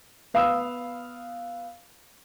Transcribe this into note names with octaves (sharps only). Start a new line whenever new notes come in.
B3 F5 B5 D#6 E6